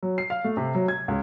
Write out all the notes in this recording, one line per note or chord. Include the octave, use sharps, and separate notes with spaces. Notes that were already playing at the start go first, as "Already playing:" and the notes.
F#3
C7
F5
A3
C3
F#3
G#6
C#2